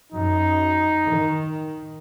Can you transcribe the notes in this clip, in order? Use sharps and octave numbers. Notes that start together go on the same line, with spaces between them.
F#2 D#4
D#3